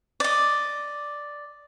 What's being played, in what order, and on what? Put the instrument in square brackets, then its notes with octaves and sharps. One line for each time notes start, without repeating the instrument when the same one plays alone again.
[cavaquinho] D5 D#5